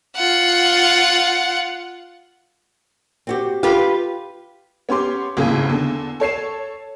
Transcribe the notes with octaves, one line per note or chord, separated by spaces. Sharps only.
F4 F#5
C4 F#4 G4
F4 G4 B4
B3 C#4 G4 C6 D6
G#1 D#2 A2 C#3
E2 D3 A4
A4 C#5 C7 E7